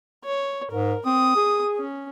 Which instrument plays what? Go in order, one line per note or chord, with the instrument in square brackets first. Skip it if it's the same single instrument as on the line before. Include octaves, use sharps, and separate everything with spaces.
[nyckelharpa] C#5
[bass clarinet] G#2 [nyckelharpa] A#4
[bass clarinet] C4 [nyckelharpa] D#6
[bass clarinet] G#4
[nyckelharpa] C#4